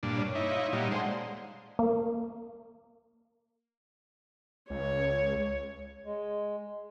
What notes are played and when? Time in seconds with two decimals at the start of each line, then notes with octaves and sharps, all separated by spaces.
0.03 G2 A#2 D4
0.17 C#5 D5
0.35 D#4 E4
0.51 F4
0.73 A#2 G3 D#4 A#4 F#5
0.91 D3 G#3 C5
1.79 A#3
4.70 C#2 C#5
6.05 G#3